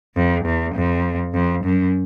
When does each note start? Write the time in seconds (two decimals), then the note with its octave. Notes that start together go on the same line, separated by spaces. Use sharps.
0.16 F2
0.45 E2
0.75 F2
1.34 F2
1.64 F#2